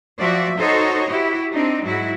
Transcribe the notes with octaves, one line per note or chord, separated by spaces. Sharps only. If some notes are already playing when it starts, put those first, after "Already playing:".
F3 F#3 F#4 D5 E5
D#4 F#4 A4 C5 C#5 D#5
E4 F#4 G4
C4 D4 D#4
G#2 F#3 E4 F#4